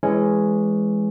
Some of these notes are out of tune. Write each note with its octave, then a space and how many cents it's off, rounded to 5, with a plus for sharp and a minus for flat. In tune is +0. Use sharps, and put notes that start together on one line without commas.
E3 +15 G#3 +0 C#4 +0